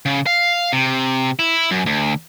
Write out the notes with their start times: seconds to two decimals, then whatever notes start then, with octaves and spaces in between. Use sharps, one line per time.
0.06 C#3
0.26 F5
0.73 C3
1.39 E4
1.71 F#2
1.86 D2